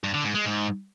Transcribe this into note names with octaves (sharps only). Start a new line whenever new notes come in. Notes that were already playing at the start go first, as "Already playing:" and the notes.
G2
D3
G#2
G#3
G#2